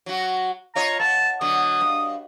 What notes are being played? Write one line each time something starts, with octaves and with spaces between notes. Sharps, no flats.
F#3 F#4
F4 C#5 D#5 A#5
B3 A5
B2 D3 F#3 D#6
G2